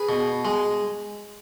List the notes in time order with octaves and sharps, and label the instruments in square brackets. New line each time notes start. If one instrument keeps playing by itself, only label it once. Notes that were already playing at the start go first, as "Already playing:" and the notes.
Already playing: [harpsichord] G#4 B4
B2
G#3